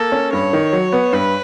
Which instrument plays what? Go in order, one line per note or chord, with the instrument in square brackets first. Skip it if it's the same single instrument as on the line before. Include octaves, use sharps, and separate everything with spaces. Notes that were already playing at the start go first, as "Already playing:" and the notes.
Already playing: [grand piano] A#3 [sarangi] A4
[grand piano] C#4
[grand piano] G2 [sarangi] C#5
[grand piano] D#3
F#3
B3
[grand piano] G2 [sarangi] B4